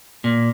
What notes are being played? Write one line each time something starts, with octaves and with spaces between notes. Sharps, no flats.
A#2